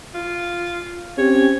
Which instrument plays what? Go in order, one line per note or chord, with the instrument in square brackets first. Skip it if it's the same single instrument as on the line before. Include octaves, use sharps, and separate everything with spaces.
[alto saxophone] F4
[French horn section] C4 C#4 G4 [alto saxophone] C#5